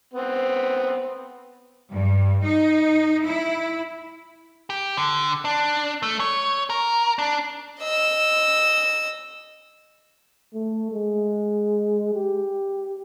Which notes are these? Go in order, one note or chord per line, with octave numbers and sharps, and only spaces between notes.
B3 C4
G2
D#4
E4
G4
D3
D4
A3
C#5
A#4
D4
D#5 E6
A3
G#3
G4